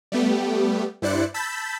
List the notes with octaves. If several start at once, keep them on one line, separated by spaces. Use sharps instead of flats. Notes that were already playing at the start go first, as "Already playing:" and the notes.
G3 A3 B3 G4
G2 E4 C5 D5 F#6 C#7
A5 B5 E6 G6 A6 B6